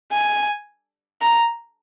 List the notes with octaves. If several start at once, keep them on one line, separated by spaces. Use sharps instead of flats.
G#5
A#5